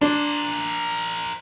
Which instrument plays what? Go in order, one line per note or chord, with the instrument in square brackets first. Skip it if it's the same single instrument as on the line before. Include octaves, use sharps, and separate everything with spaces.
[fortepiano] D4 [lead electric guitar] A#4 C5